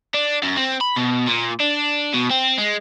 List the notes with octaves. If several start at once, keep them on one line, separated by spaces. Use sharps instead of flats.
D4
F#2
C4
B5
B2
A#2
D4
B2
C4
G#3